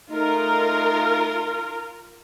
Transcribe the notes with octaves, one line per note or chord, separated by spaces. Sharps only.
A3 D#4 F4 A#4